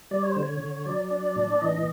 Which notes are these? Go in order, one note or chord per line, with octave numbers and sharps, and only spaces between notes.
G3 D5
C#5
D3 C5
C#5
D3
F#3 D5
D4
A2
E3 D#5